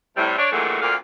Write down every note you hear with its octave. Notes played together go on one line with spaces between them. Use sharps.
A2 C3 G3
D4 C#5 D5
G2 A#2 E3 F#3 G#3 A3
D2 A#2 D3 A#3 C4 F5